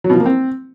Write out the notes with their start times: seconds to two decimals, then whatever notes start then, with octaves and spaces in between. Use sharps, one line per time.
0.04 F#3
0.10 B2
0.15 F3
0.20 A#3
0.26 C4